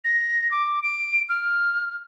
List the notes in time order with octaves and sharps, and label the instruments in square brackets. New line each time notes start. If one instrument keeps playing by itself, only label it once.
[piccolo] A#6
D6
D7
F6